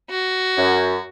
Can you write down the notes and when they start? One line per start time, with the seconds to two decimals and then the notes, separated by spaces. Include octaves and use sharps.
0.10 F#4
0.57 F#2